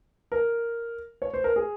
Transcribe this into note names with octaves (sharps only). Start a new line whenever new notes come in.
A#4
C#5
C5
A#4
G#4